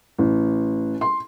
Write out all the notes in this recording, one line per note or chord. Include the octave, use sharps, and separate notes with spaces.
A1
C6